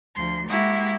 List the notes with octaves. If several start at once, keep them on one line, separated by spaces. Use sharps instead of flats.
D2 F3 C6
G#3 A#3 E4 F#4 G4